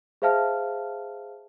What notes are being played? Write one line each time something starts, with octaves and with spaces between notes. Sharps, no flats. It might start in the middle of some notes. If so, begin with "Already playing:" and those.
G#4 C5 E5 F5 A5 F6